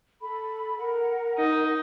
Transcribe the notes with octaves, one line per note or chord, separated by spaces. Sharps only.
A4 B5
A#4 F#5
D#4